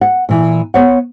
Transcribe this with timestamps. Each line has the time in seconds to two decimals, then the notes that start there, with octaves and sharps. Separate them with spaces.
0.01 F#5
0.29 A#2 E3
0.74 B3 C#5 F#5